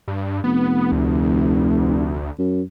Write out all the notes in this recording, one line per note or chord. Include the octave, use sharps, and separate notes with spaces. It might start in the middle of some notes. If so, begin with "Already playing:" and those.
G2
F1 B3
D2
F#2